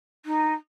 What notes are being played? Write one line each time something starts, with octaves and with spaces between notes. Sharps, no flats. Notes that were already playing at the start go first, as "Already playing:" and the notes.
D#4